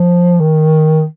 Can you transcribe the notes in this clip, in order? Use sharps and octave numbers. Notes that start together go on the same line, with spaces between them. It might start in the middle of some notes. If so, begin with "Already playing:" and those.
Already playing: F3
D#3